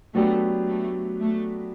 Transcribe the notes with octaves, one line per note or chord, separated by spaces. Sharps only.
F#3 A3 B3 D4 G4
A3
A3